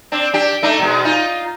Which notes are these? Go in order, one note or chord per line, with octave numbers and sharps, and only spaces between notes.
C4 D4
D4 G4
A3 D4 D#4
B2 G#3
D#4 F4